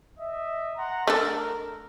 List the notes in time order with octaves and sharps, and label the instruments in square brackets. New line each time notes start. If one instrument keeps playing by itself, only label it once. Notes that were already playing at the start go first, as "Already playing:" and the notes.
[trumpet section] D#5 E5
F#5 A#5 C6
[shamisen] A3 D4 A4 [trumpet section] A#4